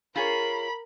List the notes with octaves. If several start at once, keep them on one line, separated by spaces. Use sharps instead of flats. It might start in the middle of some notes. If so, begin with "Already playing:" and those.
F4 G#4 A#4 C#5 B5